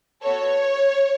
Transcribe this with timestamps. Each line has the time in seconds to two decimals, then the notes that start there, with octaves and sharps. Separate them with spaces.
0.23 B3 F#4 A4 C#5